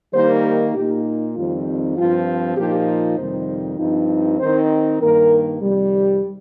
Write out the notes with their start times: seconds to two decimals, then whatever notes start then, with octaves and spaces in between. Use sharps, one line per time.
0.13 D#3 G3 A#3 D#4 C5
0.74 A#2 A#3 D#4 G4
1.35 F2 D#3 G3 C4 D#4 F4
1.97 G2 F3 C4 F4
2.57 A#2 F3 D#4 G4
3.18 F2 C3 D#3 G3 D#4 C5
3.79 G2 F3 C4 D#4
4.40 D#3 C4 D#4 C5
5.01 G2 D#3 A#3 A#4
5.62 F2 C3 D#3 G3